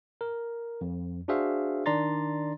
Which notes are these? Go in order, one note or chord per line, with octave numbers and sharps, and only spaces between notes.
A#4
F2
D4 F#4 G#4 C5 E5 F5
D#3 D4 D5 A#5 C6 A6